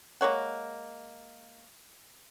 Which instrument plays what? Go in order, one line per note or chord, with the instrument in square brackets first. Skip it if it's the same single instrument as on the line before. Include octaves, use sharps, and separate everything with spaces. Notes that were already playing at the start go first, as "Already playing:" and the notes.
[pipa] G#3 A#3 C#5 F#5